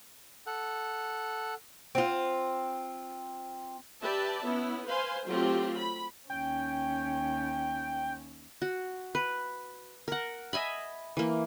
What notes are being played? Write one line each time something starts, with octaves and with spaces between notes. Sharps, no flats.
A4 F#5
C4 F4
G4 B4 D5 E5 A5
B3 C#4 E4
B4 C5 F5 G#5 C6
F#3 A3 C4 F4 G4
B5
D#2 C#4 G5
F#4
B4
A#4 F#5
D#5 E5 G#5 B5
E3 A#3